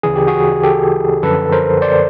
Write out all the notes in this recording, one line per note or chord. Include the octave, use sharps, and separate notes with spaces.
D2 C#3 E3 G#4
G4
F#4 G#4
G4 A4
F#2 D3 F3 A4 B4
A#4 C5
C5 D5